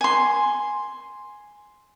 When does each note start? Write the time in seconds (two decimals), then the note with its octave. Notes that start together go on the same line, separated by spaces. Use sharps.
0.01 G#5 C6